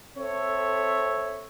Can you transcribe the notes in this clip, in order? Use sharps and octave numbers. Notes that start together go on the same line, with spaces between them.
C4 A4 C#5 E5